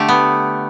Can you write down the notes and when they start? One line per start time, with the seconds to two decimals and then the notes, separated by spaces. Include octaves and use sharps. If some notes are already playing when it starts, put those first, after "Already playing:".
Already playing: D3 A3 G4
0.08 B3